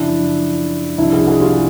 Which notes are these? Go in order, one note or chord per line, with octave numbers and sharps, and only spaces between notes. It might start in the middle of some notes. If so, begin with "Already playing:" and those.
Already playing: F#2 C#3 F3 D4 E4
C2 C3 F3 D4 E4
F#4 G#4
F#4 G#4
F4 G4